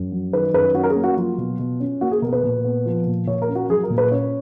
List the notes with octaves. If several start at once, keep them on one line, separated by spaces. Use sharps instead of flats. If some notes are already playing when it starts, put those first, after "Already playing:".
Already playing: F#2
F#3
D#3 B4
F#2 B4
C#4 F#4
A#4
G#4
A#3
F#4
F#3 F4
B2
B2
C#4
A#3 F#4
G#4
B2 A#4
B4
A#2
B3
F3
A#2
A#2 C#5
A#4
C#4
F#4
F#3 G#4
A#4
A#2
B4
C#4 C#5